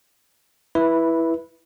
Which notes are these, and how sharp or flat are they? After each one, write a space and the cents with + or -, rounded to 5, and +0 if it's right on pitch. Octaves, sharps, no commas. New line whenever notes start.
E4 +0 B4 -15